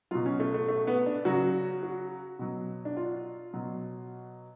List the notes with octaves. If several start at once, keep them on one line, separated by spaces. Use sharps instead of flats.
B2 F#3 F4
C#4
A3
A3
A3
B3
D4
C#3 F#3 F#4
F#4
B2 F#3
D4
F4
B2 F#3